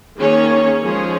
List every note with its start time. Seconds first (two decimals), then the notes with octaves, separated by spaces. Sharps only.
0.19 D#3 A#3 C#4 G#4 C#5
0.83 F3 G#3 C#4 G#4 C#5